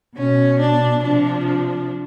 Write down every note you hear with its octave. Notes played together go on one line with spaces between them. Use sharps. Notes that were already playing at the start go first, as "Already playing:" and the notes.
B2 C#4
D4
C3 F3 D4
D4